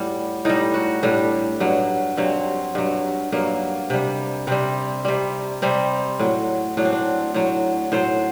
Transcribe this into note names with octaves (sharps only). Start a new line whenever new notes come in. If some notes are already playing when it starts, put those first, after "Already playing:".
Already playing: A2 G3 F#4
A2 G3 D#4
F#4
A2 G3 D4
G2 F#3
G2 F#3 C4
G2 F#3
G2 F#3 A#3
C3 G3
C3 G3 C4
C3 G3
C3 G3 C4
A2 F#3
A2 F#3 D4
C4
D4
A2 F#3
A2 F#3 C5